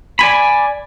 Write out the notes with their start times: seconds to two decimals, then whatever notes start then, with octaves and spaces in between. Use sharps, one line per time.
0.19 D5 G#5 B5